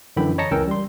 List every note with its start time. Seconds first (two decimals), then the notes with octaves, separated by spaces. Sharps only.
0.16 F#2 D3 E3 G5 B5
0.38 C#5 D#5 A5 A#5 A#6 C#7
0.51 C#2 E3 C#4 A#4 G5 E6
0.68 G3 C6